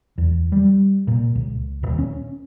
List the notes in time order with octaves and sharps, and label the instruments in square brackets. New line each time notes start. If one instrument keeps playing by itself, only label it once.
[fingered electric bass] E2
G3
A#2
C#2
D#1
C#4